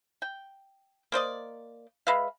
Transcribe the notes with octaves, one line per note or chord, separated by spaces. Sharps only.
G5
A#3 C5 D5 D#5
G#3 B4 E5 F5